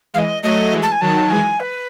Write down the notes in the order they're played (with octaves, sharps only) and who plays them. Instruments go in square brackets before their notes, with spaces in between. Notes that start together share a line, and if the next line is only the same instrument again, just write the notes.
[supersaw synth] E3 G#3 [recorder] F5
[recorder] D#5
[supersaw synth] F#3 A3 [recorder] D#5
[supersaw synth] E3 G#3
[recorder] A5
G#5
[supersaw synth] D#3 F#3 [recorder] A5
[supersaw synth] E3 G#3 [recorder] G#5
[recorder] B4